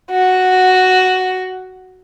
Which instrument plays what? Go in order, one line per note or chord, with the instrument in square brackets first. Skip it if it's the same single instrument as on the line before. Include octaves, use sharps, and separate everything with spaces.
[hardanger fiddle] F#4